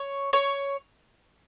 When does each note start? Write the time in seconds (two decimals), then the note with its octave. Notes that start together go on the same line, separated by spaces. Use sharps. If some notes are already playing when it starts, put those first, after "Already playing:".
Already playing: C#5
0.33 C#5